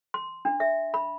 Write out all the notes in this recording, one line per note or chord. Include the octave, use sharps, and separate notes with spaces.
C6
D4
E5
B5